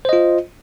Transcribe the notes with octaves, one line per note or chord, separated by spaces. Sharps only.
F4 C5 D#5